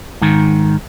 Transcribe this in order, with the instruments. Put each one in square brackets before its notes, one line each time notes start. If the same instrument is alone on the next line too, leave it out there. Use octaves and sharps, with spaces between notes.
[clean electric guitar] G#2 D#3